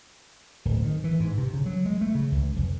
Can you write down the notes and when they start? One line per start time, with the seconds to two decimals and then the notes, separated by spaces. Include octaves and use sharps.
0.65 D1
0.84 D#3
1.04 E3
1.20 G#2
1.38 C3
1.54 C#3
1.66 F#3
1.85 G#3
2.01 A3
2.15 C#3
2.32 C#2
2.56 F1